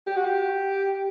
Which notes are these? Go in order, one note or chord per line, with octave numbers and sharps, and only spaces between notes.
G4
F#4
G4